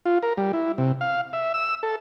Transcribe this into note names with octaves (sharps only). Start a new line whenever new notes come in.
F4
A#4
G3
E4
C3
F5
E5
E6
A4